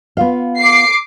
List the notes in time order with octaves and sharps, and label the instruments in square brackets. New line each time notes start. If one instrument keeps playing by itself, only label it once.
[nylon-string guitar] B3 F4 F5
[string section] D6 C7